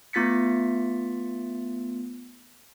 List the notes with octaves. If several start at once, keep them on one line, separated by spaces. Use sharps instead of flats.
A3 B3 F4 A6 B6 C#7